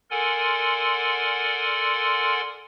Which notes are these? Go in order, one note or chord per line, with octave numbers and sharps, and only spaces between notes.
A4 A#4 D5 F#5 G#5 C6